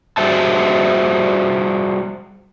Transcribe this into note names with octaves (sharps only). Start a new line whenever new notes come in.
G3 F#4 G#4 C5 E5 A5